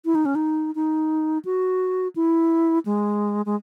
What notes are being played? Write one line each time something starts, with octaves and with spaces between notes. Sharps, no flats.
E4
D#4
C#4
D#4
D#4
F#4
E4
G#3
G#3